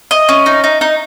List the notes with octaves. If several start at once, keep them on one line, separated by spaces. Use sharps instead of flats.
D#5
C#4
D#4
D#4
D#4